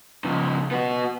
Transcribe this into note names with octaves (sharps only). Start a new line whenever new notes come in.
C#3 F3
B3 F#4